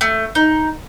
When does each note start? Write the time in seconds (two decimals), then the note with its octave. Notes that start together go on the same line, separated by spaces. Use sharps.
0.01 A3
0.35 D#4